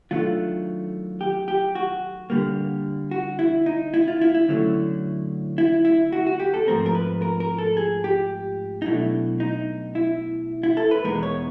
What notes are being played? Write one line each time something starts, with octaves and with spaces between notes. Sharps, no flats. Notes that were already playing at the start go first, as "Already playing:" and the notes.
D#3 F#3 A3 D4 F4
G4
G4
F#4
D3 G3 A#3
F#4
E4
D#4
E4
F4
E4
E4
D3 F#3 A3 C#4
E4
E4
F#4
F#4
G4
A4
G#2 F3 A3 C4 A#4
A#4
B4
A#4
A#4
A4
G#4
G4
D#4
B2 F#3 A3 D4 E4
D#4
E4
E4
A4
B4
E2 B2 G#3 B3 D#4 A#4
C#5